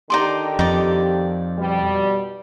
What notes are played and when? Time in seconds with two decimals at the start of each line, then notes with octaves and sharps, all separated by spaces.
0.10 D3 D#3 D#4 G4 D5 C6
0.59 F2 D#4 D5
1.57 B2 G3